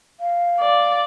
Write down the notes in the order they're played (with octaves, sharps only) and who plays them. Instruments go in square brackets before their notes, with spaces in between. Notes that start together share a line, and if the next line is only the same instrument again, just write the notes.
[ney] F5
[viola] D5